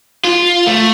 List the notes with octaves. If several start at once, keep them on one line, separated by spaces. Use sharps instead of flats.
F4
A3